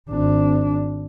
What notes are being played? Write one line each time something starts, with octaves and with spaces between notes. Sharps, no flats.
G#1 D4